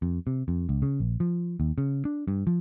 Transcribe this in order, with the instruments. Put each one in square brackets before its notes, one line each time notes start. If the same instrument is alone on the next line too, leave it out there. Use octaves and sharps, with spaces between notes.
[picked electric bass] F2
C3
F2
C#2
C#3
A#1
F3
D#2
C#3
D4
G2
F3